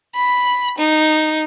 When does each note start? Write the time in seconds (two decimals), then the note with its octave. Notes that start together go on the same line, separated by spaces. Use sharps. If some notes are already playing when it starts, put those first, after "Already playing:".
0.15 B5
0.78 D#4